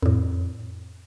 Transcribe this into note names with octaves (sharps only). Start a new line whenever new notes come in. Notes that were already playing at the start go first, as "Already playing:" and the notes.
F2 A2